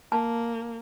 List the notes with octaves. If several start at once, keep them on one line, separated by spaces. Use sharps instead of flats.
A#3 A5